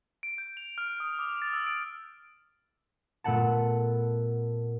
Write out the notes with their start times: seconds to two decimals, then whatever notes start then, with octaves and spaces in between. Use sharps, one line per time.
0.23 D7
0.38 G6
0.57 F7
0.78 F6
1.00 D#6
1.19 D6
1.42 A6
1.53 E6
1.67 D7
3.24 A#2 A3 B3 F#5 A5